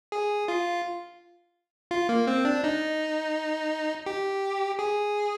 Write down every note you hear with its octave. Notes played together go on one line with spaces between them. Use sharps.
G#4
F4
F4
A#3
C4
D4
D#4
G4
G#4